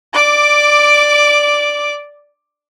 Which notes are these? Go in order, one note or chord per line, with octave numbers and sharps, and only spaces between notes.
D5 D6